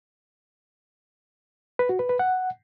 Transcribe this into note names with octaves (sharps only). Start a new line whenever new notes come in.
B4
F#4
B4
B4
F#5